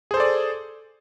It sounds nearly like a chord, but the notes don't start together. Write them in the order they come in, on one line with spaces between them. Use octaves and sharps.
G#4 C5 A4 D5